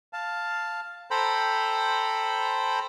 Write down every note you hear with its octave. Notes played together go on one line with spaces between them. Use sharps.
F5 A5
A4 C5 G5 A#5 B5